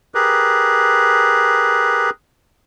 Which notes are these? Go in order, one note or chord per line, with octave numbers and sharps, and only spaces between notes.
G4 G#4 A#4 B4